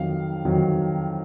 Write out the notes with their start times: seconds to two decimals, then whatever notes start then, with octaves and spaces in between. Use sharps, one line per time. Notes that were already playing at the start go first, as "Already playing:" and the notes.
Already playing: F2 D#3 F#3 F5
0.45 F2 D#3 F#3